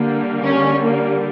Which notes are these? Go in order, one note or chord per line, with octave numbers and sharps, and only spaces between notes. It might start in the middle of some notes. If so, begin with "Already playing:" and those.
Already playing: D3 G3 A#3
C#4
A#3